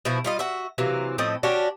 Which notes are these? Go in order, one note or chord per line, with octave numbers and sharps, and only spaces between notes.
B2 F3 E4
G3 F4 D#5
F#4 E5
C3 E3 F#3 A#3
A2 F3 C4 D#5
C#4 D4 F#4 G4